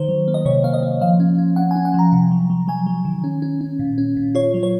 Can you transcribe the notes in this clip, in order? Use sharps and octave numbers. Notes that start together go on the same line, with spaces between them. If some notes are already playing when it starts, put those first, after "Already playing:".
Already playing: D#3 C5
F#3
A#3
D#5
C3 C#5
A#3 F5
D#5
A#3
F3 F5
C#4
C#4
C#4 F#5
G#5
C#4
F#5
F3 A#5
C3
F#3
F#3
F#3 G#5
F#3
D#3
C#4
C#4
C#4
A#2
C#4
A#2
F4 C#5
F#3
C#5